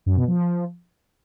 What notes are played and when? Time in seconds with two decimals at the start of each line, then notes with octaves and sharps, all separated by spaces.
0.06 F#2
0.17 B2
0.28 F3